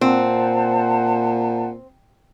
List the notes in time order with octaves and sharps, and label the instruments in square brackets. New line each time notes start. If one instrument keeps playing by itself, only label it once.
[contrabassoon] A#2 [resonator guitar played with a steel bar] C4 [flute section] C5 F#5 A5